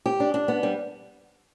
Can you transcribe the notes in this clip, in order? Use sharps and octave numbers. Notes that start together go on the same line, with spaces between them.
G4
D4
D4
B3
G3